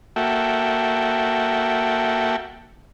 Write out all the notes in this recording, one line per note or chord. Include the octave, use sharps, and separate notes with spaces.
A#3 F#4 A4 E5 G5